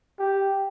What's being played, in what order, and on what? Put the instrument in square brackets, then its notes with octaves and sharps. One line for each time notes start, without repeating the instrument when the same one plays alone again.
[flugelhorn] G4